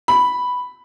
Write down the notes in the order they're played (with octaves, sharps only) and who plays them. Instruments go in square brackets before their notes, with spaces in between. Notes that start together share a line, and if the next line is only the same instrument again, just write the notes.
[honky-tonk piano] B5